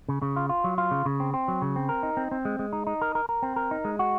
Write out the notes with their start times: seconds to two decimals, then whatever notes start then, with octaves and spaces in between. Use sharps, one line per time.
0.09 C#3
0.22 C#3
0.36 F4
0.49 F4
0.64 F#3
0.78 F4
0.91 C#3
1.06 C#3
1.20 C4
1.34 C4
1.48 F#3
1.62 C#3
1.76 C4
1.89 A#4
2.03 D#4
2.17 C4
2.31 C4
2.45 G#3
2.59 G#3
2.73 D#4
2.87 D#4
3.02 A#4
3.15 A#4
3.29 A#4
3.43 C4
3.56 A#4
3.71 D#4
3.85 G#3
3.99 F#4